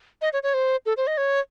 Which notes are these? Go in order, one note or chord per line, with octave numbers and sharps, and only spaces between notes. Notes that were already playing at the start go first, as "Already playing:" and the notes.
D#5
C#5
C#5
C5
A4
C5
D#5
C#5